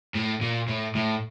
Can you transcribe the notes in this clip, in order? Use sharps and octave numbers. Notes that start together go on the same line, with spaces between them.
A2
A#2
A2
A2